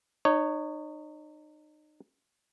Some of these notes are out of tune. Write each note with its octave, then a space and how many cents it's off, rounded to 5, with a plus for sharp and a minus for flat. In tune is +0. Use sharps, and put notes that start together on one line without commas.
D#4 -35 C#5 +0